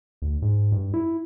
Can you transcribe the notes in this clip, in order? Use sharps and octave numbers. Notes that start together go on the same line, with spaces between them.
D2
G#2
G2
E4